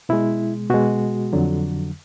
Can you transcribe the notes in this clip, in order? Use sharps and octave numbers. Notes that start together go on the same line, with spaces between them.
B2 G#3 E4
B2 G#3 F#4
F2 D3 F#3